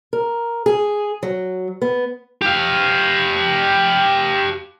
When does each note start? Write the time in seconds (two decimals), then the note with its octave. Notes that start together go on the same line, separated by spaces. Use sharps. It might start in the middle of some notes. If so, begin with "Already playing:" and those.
0.13 A#4
0.66 G#4
1.23 F#3
1.82 B3
2.42 G4 F5